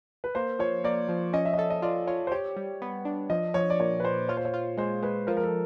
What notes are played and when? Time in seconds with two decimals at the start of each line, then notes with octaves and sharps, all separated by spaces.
0.24 B4
0.35 A#3 C5
0.59 F3 C#5
0.84 A#3 D5
1.09 F3
1.33 C#4 D#5
1.45 E5
1.53 D#5
1.58 A4 E5
1.70 D#5
1.82 F4 D5
2.07 F4 C#5
2.27 C5
2.32 G4 C#5
2.56 G3
2.82 B3
3.05 D4
3.30 F3 D#5
3.54 F3 C#5
3.70 D5
3.80 A#2 C#5
4.00 B4
4.03 A#2 C5
4.29 F4 C#5
4.37 C5
4.45 C#5
4.54 F4
4.77 G#3 C5
5.02 G#3 B4
5.27 F3 A#4
5.37 A#4
5.44 A4